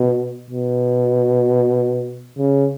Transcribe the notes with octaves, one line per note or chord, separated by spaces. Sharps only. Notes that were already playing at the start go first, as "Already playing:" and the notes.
Already playing: B2
B2
C#3